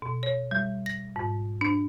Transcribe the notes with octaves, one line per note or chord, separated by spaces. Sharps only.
B2
C#5
G3
A#6
G#2
D4